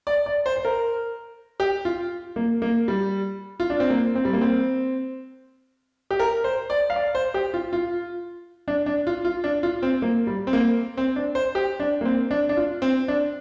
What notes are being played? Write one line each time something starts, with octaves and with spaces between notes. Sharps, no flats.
D5
D5
C5
C5
A#4
G4
F4
A#3
A#3
G3
F4
D4
C4
A#3
C4
G3
A#3
C4
G4
A#4
C5
D5
F5
D5
C5
G4
F4
F4
D4
D4
F4
F4
D4
F4
C4
A#3
G3
C4
A#3
C4
D4
C5
G4
D4
A#3
C4
D4
D4
F4
C4
D4